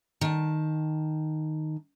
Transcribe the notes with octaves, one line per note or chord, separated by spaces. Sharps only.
D#3 A5